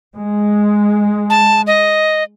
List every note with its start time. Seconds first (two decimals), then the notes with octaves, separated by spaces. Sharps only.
0.17 G#3
1.30 A5
1.67 D#5